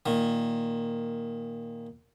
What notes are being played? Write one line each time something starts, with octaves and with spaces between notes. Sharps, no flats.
A#2 D#3